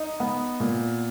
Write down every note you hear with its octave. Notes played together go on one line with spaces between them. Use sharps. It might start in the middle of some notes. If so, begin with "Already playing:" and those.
Already playing: D#4
B3
A#2